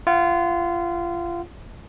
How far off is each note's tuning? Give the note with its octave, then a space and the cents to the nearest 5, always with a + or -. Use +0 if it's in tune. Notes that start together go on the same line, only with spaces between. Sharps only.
F4 -25 F#5 +0